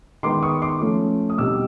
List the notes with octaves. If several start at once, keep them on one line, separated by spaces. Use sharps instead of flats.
D#3 G#3 B3 C6 D6
C#6 D#6
C6 D6
F3 A3 C#4
D#6
B2 G3 C4 D#4 D6 E6